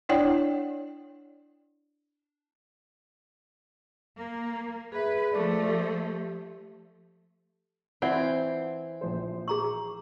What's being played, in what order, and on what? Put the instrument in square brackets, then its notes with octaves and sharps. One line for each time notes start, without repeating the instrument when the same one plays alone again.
[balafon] D4 E4 C#5 D5 F#5 G5
[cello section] A#3
[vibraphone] G#4 E5 [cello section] B4
[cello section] F3 A3 [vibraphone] D5 D6
[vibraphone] G4
[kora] E3 [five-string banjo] C4 [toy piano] F4 D5 F#5
[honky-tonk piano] A#1 F3 C5
[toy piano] G#4 A#5 C#6